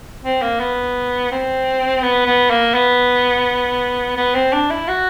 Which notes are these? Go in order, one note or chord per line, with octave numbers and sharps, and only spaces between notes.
C4
A#3
B3
C4
B3
B3
A#3
B3
B3
C4
D4
E4
F#4